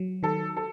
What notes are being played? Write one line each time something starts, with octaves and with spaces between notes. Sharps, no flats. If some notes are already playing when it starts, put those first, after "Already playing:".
Already playing: F#3
D#3 A4
A4